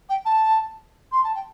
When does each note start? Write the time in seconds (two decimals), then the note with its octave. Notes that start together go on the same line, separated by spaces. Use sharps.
0.09 G5
0.25 A5
1.12 C6
1.23 A5
1.35 G5